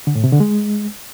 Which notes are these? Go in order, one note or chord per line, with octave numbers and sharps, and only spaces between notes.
D3
A2
C3
D3
G#3